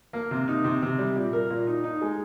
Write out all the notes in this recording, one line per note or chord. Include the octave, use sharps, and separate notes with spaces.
A#3
C3
D#4
C3
C3
G3
A#2
A#4
A#2
D#4
D#4
G#3